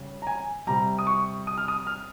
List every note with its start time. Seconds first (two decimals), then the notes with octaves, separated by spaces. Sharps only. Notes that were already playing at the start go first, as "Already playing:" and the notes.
Already playing: C#3 G3
0.22 A#5
0.27 G#5
0.67 C3 G3 A#5
0.99 D#6
1.07 C#6
1.47 D#6
1.57 F6
1.68 D#6
1.87 F6